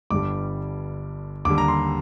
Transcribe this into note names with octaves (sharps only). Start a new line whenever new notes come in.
G1 G2 D3 G3 D6
D#2 D3 G3 D6
A#5
C6